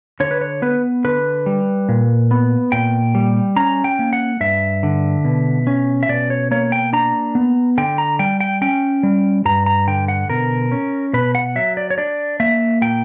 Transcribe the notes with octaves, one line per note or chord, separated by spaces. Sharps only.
D3 C#5
B4
C#5
B3 B4
D3 B4
G3
A#2
B3
A#2 G5
G3
C#4 A#5
G5
A#3
F#5
G2 E5
D3
B2
C#4
E5
B2 D5
C#5
A#3 C#5
G5
D4 A#5
B3
D3 G5
A#5
G3 G5
G5
C#4 G5
G3
G2 A#5
A#5
D3 G5
F#5
B2 A#4
C#4
B2 B4
F#5
F#3 E5
D5
C#5
D4 D5
A#3 E5
A#2 G5